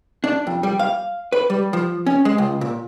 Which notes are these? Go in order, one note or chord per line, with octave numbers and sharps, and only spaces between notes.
D4
F2
G3
F5
B4
G3
F3
C#4
G#3
C#2
A#2